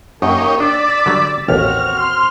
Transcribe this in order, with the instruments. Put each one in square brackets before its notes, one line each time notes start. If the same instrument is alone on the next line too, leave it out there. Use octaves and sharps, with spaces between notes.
[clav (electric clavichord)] F#2 [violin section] A#3 D#4 [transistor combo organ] G4 C#5 D#5
[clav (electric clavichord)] D4 [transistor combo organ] D5 [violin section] E6 A6 B6
[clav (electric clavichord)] D3 F#3 G3
[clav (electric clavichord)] A1 D#2 [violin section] C4 F#4 [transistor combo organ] F6
[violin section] C6